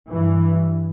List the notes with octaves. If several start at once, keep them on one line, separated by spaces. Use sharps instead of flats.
G2 E3